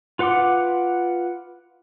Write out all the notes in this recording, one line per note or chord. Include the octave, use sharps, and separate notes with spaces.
F4 B4 F#5 C6 D6